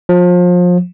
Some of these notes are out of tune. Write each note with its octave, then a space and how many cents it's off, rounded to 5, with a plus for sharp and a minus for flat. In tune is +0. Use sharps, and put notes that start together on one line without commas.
F3 +30